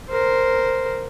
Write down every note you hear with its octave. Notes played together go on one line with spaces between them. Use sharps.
A#4 C5